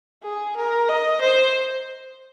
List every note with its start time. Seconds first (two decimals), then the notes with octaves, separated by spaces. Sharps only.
0.23 G#4
0.57 A#4
0.89 D#5
1.22 C5